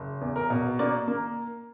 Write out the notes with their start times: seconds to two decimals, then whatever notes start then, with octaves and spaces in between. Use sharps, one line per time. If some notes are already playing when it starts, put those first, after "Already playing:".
Already playing: F#1
0.21 E2
0.36 A#4
0.50 B2
0.79 A#3 D5
1.08 A#3